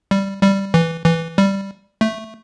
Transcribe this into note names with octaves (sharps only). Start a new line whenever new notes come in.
G3
G3
E3
E3
G3
A3